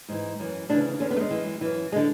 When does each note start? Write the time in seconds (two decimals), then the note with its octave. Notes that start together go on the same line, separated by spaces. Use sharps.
0.08 G#2 E3
0.39 F#2 E3
0.69 D2 C#3 E3 D4
1.00 E2 D3 C#4
1.11 B3
1.17 A3
1.20 G#3
1.30 F#2 E3
1.61 F#2 E3
1.92 G#3
1.96 D3